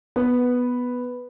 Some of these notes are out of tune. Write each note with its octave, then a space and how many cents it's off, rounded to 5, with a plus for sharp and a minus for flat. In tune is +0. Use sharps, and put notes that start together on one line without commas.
B3 +0 B4 +0